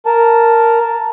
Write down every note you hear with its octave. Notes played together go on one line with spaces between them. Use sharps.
A#4 A5